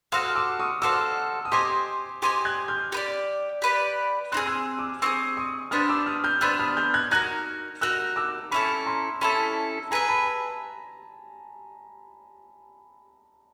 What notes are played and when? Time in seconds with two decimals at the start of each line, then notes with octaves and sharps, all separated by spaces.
0.12 F#4 A4 C5 F5 D#6 F6
0.36 D6 E6
0.60 C#6 D#6
0.82 F#4 A4 C5 F5 D6 E6
1.45 D#6
1.52 G4 C5 D#5 G#5 C6 D6
2.22 G4 C5 D#5 G#5 C6 D6
2.45 F#6 G#6
2.68 F6 G6
2.92 G4 B4 D5
3.62 G4 B4 D5
4.32 C4 D#4 F#6
4.37 G#4 F6
4.47 E6 F#6
4.79 D6 E6
5.02 C4 D#4 G#4 C#6 D#6
5.37 C#6 D#6
5.71 B3 D4 G4 C5 D#6 F6
5.89 D6 E6
6.06 D#6 F6
6.24 F6 G6
6.41 B3 D4 G4 C5 E6 F#6
6.59 D#6 F6
6.77 F6 G6
6.94 F#6 G#6
7.11 D#4 F#4 A#4 F#6 G#6
7.81 D#4 F#4 A#4 E6 F#6
8.16 D6 E6
8.51 C#4 E4 A4 B5 C#6
8.86 A#5 C6
9.21 C#4 E4 A4 A5 B5
9.91 G#4 B4 E5 G#5 A#5
10.08 A5 B5